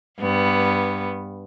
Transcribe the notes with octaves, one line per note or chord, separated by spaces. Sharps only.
G2 B3